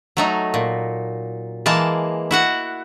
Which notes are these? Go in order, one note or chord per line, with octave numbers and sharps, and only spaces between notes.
F#3 A3 D#4
A#2
E3 G#3 A#3 A5
E4 F#4 F#5